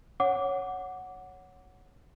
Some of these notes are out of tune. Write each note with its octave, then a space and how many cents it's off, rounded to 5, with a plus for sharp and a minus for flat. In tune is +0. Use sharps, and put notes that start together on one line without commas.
C#5 +0 F#5 +0 D6 -15